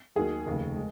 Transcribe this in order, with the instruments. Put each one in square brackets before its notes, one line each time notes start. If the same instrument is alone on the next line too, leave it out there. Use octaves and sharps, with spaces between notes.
[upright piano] D#2 D#3 F#3 G#4
F1 D#2 C#3
G#3